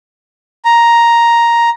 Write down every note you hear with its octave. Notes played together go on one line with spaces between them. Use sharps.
A#5